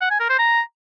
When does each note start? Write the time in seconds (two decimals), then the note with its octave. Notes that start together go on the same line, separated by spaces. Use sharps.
0.01 F#5
0.10 G#5
0.20 A#4
0.29 C5
0.39 A#5